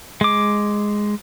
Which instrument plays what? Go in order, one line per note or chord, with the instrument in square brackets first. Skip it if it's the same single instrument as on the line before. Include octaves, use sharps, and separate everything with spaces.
[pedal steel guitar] G#3 D6